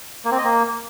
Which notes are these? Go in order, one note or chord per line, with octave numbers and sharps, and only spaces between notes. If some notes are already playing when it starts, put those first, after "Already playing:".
A#3
C4
D#5
A#3